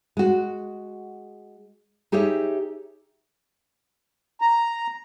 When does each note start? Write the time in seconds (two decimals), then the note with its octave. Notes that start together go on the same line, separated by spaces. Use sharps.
0.17 G#3 F#4
2.12 D#4 G4 G#4 C#5 E5
4.42 A#5